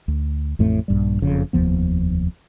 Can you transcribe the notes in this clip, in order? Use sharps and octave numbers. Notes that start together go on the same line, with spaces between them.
D2
A1 F2 A2 A3
A#1 G2 G3
F#1 F2 C#3
F1 D#2 F3 B3